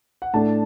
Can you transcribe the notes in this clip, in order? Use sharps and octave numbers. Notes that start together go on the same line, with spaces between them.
F#5
A2 A3 D4 A5